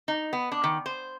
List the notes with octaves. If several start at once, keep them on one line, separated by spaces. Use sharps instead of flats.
D#4
B3
D4
D#3
C5